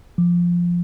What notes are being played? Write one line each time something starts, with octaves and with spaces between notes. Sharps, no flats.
F3